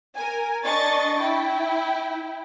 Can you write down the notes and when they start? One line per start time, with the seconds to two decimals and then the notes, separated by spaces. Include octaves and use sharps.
0.15 A#4 G#5
0.64 D4 D#5 C#6 A6
1.18 E4 G5